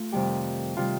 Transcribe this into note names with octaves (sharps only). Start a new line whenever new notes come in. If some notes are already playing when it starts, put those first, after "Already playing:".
Already playing: A3 F4
F2 C3 D#3 G3 G4
C3 D#3 G3 F4